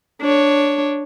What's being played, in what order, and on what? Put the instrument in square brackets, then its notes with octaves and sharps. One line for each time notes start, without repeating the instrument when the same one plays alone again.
[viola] D4 C#5